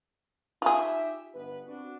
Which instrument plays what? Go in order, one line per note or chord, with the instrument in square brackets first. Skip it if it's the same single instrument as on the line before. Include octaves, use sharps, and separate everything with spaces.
[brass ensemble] D#4 G4 E5 [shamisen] F4 G#4
[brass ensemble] G1 B3 B4
C4 D4 F#4